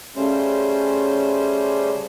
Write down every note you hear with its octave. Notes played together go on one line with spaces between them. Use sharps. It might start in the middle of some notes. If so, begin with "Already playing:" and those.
C#3 G3 A3 C#4 C5